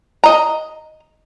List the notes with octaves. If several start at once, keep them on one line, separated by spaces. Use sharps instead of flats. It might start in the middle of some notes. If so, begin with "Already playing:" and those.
D#5 A#5